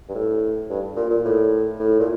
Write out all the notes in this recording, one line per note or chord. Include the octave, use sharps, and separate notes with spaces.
G2
A2
G2
A#2
A#2
A2
A2
A#2